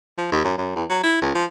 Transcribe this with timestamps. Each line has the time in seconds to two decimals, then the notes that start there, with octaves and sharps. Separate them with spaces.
0.18 F3
0.31 D#2
0.44 F#2
0.58 F#2
0.76 E2
0.89 F#3
1.03 E4
1.22 C#2
1.35 F3